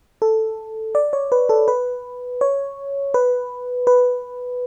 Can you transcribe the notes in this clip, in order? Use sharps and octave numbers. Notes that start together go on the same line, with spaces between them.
A4
D5
C#5
B4
A4
B4
C#5
B4
B4